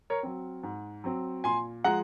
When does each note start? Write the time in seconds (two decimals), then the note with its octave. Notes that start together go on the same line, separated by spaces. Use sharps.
0.10 A#4 C#5
0.23 F#3 C4
0.63 G#2
1.04 F#3 C4
1.44 A#2 G#5 C6
1.84 F3 G#3 F#5 A#5